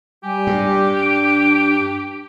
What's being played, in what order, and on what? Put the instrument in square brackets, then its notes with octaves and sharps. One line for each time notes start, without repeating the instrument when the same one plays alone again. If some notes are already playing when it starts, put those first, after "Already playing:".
[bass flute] G3 [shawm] G4 [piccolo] G#5
[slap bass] G2
[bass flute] D4 [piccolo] D7